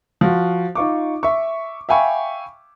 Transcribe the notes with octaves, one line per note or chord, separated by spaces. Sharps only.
F3 F#4
D#4 F4 C#6 D6
E5 C#6
E5 F5 G5 G#5 B5 C#6